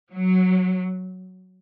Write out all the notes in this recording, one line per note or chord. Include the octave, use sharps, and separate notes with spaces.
F#3